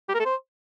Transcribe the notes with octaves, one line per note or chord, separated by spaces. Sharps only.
G4
A#4
A4
C5